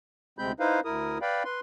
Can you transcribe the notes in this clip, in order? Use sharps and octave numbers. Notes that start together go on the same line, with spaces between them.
D2 C3 G#3 C4 B5 G6
D#4 E4 B4 C5 F5
D2 E4 A#4 D#6
B4 D5 F5 G5 B5
B4 C6